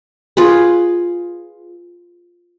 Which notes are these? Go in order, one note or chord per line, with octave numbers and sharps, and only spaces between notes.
F4 G#4 B4